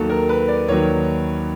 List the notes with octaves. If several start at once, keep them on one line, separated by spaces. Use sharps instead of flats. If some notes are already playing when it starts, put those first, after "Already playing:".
Already playing: D#2 D#3 F#3 A4
A#4
B4
D5
D#2 D#3 F#3 C#5